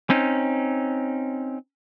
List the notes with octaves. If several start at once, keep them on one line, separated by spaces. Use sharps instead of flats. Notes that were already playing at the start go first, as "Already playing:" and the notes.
C4 C#4 D#4